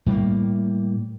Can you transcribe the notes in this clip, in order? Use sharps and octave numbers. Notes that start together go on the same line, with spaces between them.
A2 G3 A3 A#3